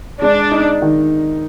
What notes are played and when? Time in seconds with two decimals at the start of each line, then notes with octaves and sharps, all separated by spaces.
0.22 G#3 D4
0.51 D#4
0.82 D#3